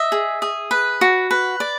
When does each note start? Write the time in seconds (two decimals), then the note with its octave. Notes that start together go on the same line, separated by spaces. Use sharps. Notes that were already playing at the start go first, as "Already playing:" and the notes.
Already playing: D#5 E5
0.12 G#4
0.42 G#4
0.71 B4
1.01 F#4
1.31 B4
1.60 D5